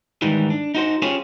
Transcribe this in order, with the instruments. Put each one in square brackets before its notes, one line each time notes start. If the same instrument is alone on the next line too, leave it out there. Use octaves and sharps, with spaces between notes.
[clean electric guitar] G#2 D#3 E3 G3
D4
D#4 F#4 C5
C#4 F4 G4 G#4 C5 C#5